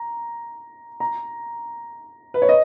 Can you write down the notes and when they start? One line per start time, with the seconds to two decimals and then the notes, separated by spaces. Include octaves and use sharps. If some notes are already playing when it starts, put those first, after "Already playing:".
Already playing: A#5
1.00 A#5
2.34 B4
2.42 C#5
2.49 D#5